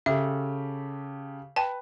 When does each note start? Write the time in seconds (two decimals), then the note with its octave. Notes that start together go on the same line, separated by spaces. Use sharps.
0.06 C#3 G4 A4 E5
1.56 B4 G5 A5